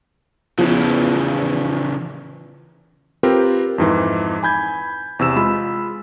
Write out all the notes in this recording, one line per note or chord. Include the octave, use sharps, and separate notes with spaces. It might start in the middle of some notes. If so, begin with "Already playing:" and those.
E2 C#3 E3 F3 B3
C4 F4 G4 A#4 B4
F2 G#2 E3
G#5 B5 G6 G#6
E2 C3 E6 E7
G#3 F4 B5